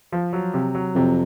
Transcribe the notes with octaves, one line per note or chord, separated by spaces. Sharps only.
F3
F#3
C3
F#3
F2 C3